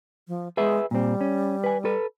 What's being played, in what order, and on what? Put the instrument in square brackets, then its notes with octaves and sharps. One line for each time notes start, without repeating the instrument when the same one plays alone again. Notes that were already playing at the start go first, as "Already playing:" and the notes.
[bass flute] F3
[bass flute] G#3 [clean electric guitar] G#4 B4 E5
[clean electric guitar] A#2 C4 [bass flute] G3
[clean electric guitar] C#4
B4 G#5
A4 B4